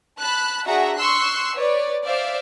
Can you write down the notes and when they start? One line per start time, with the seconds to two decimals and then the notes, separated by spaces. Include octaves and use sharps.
0.20 A5 B5 F#6
0.66 D4 F#4 G#4 E5 F#5 A#5
0.97 C6 C#6 E6 F#6 C7
1.55 B4 C#5 D5
2.06 C5 D5 E5 F5